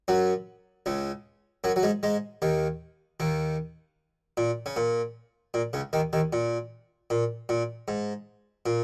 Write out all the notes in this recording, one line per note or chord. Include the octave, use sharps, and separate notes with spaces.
F#2 F#3
C#2 C#3
F#2 F#3
F#3
G#2 G#3
G#2 G#3
D#2 D#3
D#2 D#3
A#2
C#3
A#2
A#2
C#2 C#3
D#2 D#3
D#2 D#3
A#2
A#2
A#2
G#2
A#2